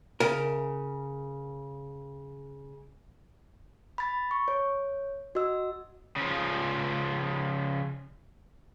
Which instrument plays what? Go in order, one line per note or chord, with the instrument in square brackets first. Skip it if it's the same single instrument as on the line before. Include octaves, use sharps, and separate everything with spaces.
[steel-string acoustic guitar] C#3 [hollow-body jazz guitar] A#4
[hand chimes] B5 A6
C#6
C#5
F#4 D#5 E6
[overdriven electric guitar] C#3 F3